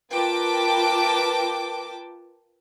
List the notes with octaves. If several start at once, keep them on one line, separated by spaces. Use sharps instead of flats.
F4 A#4 B4 G5 A5 D6